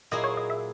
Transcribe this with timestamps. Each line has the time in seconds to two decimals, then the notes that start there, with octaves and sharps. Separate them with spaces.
0.11 A#2 F#3 A#3 E4 G#4 D#5
0.24 C#5
0.37 D#5
0.50 E5